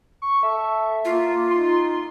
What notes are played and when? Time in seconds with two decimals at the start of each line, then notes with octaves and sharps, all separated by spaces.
0.22 C#6
0.43 A4 E5
1.05 A#3 F4
1.50 D#4 C6